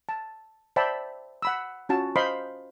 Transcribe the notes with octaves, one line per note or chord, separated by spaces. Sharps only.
A5
C5 D5 E5 G5 A5 B5
F#5 B5 E6
C#4 F4 F#4 A5
C5 D#5 F5 B5 C6